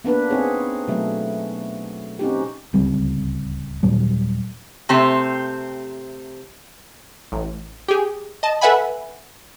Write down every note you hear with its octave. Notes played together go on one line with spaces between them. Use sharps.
A#3 B3 D4 B4
C4 D#4 G#4 C#5
B2 F#3 A3
C4 C#4 D#4 F#4 G4
D1 C#2 G3 C4
D#2 A#2 F#3 G3
C3 A3 C4 G4 C5
A1
G4 G#4
D#5 A5
A4 B4 E5 F#5 G#5 B5